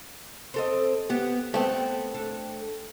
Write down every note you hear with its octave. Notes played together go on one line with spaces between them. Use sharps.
C4 A4 D#5
B3 G4
A3 B3 C4
D4 A4